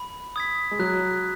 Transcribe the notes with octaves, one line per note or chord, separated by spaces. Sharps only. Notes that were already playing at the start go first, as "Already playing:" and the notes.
Already playing: B5
D#6 G#6 B6
G#3
F#3 F#6